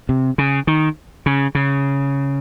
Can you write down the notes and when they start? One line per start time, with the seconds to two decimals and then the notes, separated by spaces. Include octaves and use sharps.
0.09 C3
0.38 C#3
0.67 D#3
1.26 C#3
1.55 C#3